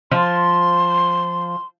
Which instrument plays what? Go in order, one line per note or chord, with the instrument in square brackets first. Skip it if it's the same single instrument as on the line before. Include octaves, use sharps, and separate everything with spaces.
[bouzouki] F3 [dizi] C6